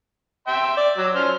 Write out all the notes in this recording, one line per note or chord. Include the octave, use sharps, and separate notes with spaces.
E5 G5 C6
D5
F#3 E6
C#4 C5 F6